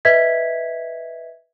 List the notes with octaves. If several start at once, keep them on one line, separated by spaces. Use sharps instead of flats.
B4 D#5 E5 G#6 B6